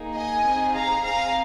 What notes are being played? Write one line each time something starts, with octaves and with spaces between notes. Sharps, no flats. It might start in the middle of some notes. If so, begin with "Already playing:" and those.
Already playing: A#3 D#4 G#4
D#5 G#5
C4 D#4 G#4
F5 A#5
C4 G#4 F5 A#5